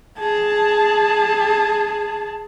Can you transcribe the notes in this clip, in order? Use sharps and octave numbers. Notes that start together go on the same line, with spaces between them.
G#4 A5